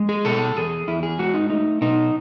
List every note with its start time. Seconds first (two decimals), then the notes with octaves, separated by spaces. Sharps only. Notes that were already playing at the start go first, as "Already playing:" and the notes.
Already playing: G#3
0.09 G#4
0.25 B2 A4
0.56 E2 G#4
0.87 E2 E4
1.03 G#4
1.19 G#3 F#4
1.34 D#4
1.50 A3 D#4
1.81 B2 D#4